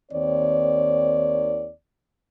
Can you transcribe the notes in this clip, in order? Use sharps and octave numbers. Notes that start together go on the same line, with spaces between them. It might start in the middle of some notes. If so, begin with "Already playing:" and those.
D#2 D#3 C4 C#5 D5